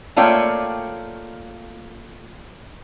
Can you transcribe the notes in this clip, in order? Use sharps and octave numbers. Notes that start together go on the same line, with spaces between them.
A3 A#3 F4 C#5 D5 G5